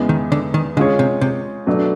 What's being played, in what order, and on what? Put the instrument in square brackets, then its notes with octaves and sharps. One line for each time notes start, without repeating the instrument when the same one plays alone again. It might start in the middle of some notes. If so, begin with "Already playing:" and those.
Already playing: [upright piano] E2 C#3 E3 G#3 B3
[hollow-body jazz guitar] D#3
D3
D#3
[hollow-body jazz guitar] D3 [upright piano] G#3 C#4 F4 G#4 C#5
[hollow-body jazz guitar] C3
C3
[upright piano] B2 F#3 A3 D4